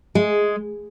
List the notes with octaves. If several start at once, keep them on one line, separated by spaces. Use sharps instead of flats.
G#3